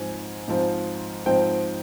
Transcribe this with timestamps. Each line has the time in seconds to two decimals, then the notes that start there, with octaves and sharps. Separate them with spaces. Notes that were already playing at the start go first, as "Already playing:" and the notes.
Already playing: G#2 F3 C4 G#5
0.48 G#2 F3 C4
1.26 G#2 F3 C4 G5